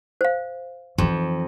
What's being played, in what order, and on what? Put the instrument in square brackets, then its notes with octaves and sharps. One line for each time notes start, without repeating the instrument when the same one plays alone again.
[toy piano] C5 F5
[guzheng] F2 [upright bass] E3 D#4